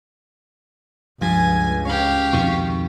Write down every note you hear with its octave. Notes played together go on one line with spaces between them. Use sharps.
C#2 G2 F3 G#5
C#4 G4 F5
F2 B2 D#3 C#6